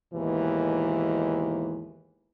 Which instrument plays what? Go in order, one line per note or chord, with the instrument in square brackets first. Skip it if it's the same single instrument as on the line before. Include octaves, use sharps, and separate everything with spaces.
[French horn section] D#2 G#2 B2 E3